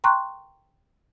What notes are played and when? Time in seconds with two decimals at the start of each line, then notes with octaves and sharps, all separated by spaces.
0.04 G5 A#5 C6 C#6 F#6